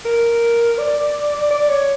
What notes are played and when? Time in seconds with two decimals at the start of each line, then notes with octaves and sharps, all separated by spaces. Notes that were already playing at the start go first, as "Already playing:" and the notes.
0.05 A#4
0.78 D5
1.51 D5
1.69 C#5